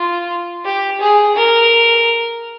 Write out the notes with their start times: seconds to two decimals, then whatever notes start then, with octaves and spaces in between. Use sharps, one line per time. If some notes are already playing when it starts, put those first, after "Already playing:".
Already playing: F4
0.65 G4
1.00 G#4
1.35 A#4